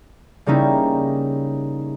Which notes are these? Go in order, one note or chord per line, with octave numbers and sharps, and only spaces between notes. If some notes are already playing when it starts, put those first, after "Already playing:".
C#3 G3 A#3 C#4 D#4 E4